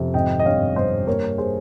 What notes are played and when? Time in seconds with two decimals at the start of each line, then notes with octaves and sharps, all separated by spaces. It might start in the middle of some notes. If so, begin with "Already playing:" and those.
Already playing: F2 C3
0.14 G#1 D#5 G5
0.39 D#5
0.45 G2 C#5 F5
0.76 G3 C5 D#5
1.07 A#3 A#4 C#5
1.38 G#4 C5